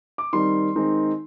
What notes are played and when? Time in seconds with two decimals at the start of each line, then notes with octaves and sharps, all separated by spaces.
0.18 D6
0.33 D#3 G3 C4 D#4 C6
0.76 D#3 G#3 C4 D#4